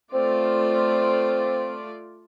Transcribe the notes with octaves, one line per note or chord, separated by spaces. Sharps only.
A3 C4 F4 D5